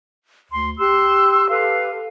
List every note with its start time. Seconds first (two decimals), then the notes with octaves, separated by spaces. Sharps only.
0.52 D2 C6
0.79 G4 C6 E6 F#6
1.49 G4 A4 B4 F5